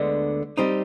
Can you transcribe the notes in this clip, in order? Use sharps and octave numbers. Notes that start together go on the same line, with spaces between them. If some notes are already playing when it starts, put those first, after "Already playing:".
Already playing: D2 D3 G#3 B3 D4
G3 C4 D#4